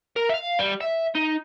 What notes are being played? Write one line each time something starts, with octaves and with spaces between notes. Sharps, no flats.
A#4
E5 F5
G3
E5
D#4